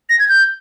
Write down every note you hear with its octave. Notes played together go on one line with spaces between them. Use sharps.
A#6
G#6
G6